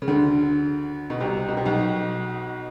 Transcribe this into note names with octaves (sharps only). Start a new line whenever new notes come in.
C#3
D2 D3
B2
C2 C3
B2
C3
B1 B2